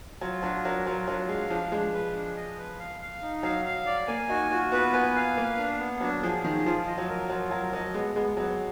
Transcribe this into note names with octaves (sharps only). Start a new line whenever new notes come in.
F#3 F4
F#3 D4
F#3 A#4
F#3 F4
F#3 D4
G#3 F5
F3 D4
G#3 D4
B4
D4
D#5
B4
F5
F5
D#4
F#3 F5
F5
D5
A#3 G#5
D#4 F#4
F4 F#4
B3 B4
B3 G#5
F5
A#3 B4
D4
B3
F#3 D4
F3 G#4
D#3 G#4
F3 F4
D#5
F#3
A#4
F#3 F4
F#3 A#4
F#3 D#5
G#3 B3
G#3 B3
F#3 B3